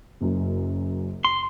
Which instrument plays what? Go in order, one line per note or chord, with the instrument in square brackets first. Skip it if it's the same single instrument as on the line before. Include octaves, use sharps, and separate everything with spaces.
[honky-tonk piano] F#1 F#2
[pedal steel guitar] C6